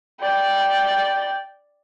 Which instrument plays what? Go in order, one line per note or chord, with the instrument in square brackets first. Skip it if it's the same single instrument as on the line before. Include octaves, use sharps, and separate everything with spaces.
[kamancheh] D5 G5